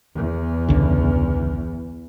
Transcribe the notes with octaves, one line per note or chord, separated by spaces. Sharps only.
E2
G1 C#2 D3